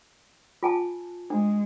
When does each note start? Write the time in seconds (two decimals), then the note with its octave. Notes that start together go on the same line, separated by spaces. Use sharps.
0.63 F4 G#5 A5
1.30 G#3 D4